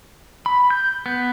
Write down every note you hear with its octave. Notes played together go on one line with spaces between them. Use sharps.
B5
G6
B3